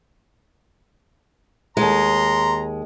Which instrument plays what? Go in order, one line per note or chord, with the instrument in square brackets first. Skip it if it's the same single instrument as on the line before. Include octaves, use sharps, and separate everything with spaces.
[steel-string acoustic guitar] D#2 G#3 [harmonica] A#5 C6